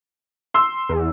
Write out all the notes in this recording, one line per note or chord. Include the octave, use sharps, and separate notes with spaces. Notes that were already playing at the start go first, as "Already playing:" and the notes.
C6 E6
E2